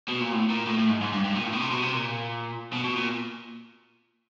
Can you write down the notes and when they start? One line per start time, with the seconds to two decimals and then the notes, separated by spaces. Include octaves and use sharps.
0.09 B2
0.21 A#2
0.32 A2
0.50 A#2
0.66 A2
0.78 A2
0.90 G#2
1.01 G#2
1.13 G2
1.24 G2
1.35 A#2
1.44 A2
1.53 B2
1.61 C3
1.71 B2
1.82 C3
1.94 A#2
2.73 B2
2.84 B2
2.96 A#2